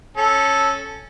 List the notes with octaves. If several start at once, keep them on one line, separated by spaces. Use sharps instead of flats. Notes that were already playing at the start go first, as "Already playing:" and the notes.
C#4 A4